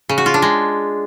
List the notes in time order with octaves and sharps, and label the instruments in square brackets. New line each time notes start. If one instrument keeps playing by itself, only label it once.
[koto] C#3
F#4
F4
D4
G#3